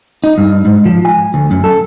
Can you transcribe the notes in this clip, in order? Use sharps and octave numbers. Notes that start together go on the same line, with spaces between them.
D#4
G2
G#2
F3
G#5
D2
F#2
A4